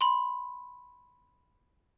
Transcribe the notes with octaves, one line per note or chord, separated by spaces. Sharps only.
B5 C6